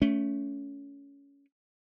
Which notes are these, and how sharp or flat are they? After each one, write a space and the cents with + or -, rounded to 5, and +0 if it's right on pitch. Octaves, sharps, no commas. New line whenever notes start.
A3 +0 C#4 +20